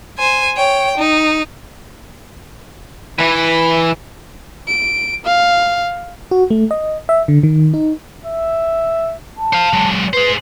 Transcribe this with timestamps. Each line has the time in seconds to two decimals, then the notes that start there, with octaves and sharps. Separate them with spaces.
0.18 C5 G#5
0.57 C#5 G5
0.98 D#4
3.19 E3 B4
4.68 D7
5.25 F5
6.31 F#4
6.50 A3
6.71 D#5
7.09 E5
7.28 D3
7.43 D#3
7.74 D#4
8.25 E5
9.38 A5
9.53 C5 F5
9.73 F#3 G#3
10.13 G#4 B4 C5